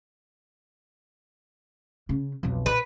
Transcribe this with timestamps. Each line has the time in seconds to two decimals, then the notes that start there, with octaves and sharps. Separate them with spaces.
2.09 C#3 C#4
2.43 B1 F2
2.66 A#2 B4